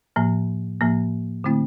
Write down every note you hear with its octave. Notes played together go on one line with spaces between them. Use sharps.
A2 F3 A#3
A2 F3 A#3
D3 A3 C4 E4